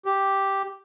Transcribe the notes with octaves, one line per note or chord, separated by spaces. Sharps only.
G4